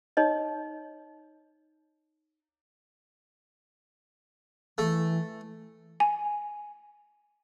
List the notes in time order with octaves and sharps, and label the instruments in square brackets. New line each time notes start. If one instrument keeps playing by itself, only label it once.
[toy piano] D#4 C#5 D#5
[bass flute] E3 [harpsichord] A3
[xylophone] G#5